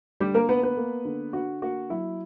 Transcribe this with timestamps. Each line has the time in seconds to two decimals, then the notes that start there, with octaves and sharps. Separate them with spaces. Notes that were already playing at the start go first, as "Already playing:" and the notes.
0.20 D3 G3 G4
0.34 A#3 A#4
0.49 A#3 B3 B4
0.63 B3 B4
0.77 A#3
1.05 D3
1.33 D3 F#4
1.62 A#3 F#4
1.90 F#3 E4